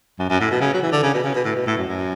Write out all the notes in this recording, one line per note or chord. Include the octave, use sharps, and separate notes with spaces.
F#2
F#2
A2
B2
C#3
F#3
E3
D3
C#3
B2
C#3
B2
A2
B2
A2
F#2
F#2